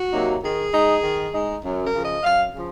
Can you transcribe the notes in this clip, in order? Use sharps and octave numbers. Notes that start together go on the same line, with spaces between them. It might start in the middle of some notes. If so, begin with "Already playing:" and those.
Already playing: F#4
C3 F#3 A#3 D#4
D#3 G#4
G#3 D#4
D#3
G#3 D#4
F#2
A#4
C#3 F3
D#5
F#2 F5
C#3 F3